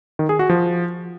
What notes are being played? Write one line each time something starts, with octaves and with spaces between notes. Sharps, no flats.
D#3
G#4
F#4
F3